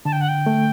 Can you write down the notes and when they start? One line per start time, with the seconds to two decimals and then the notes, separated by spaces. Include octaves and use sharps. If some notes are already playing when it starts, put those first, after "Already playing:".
0.05 D3 A5
0.13 G5
0.21 F#5
0.28 G5
0.46 A3